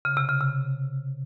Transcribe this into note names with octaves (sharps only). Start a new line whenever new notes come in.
C#3
C3
C#3
C3